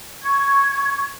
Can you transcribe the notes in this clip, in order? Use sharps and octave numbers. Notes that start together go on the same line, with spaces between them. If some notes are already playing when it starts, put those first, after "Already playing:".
C#6 G#6